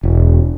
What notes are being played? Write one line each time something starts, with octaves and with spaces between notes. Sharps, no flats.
E1